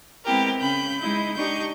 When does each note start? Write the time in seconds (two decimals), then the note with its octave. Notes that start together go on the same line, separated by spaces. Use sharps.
0.24 G#3 B3 C4 E4 G4 A#4
0.60 C#3 C#4 B5 G6
0.99 G#3 D#4 E4 G6
1.35 D4 D#4 G4 C#6 G6